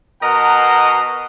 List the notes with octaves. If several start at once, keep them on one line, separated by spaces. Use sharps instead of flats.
B2 A#4 D#5 F#5 A#5